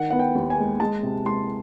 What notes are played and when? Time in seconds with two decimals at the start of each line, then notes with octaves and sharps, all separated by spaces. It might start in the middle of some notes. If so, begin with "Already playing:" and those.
Already playing: D#3 F#5
0.10 B3 F#5
0.19 G5
0.35 D#2
0.50 G#5
0.58 G#3
0.80 G#3 A5
1.03 C3
1.25 G#3 C6